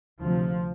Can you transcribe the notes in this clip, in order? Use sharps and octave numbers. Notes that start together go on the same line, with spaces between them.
D2 C3 F3